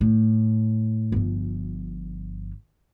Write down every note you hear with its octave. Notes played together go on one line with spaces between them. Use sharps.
A2
G1 F3